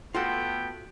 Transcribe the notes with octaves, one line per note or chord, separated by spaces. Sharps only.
A3 B3 F4 F#4 A4 G5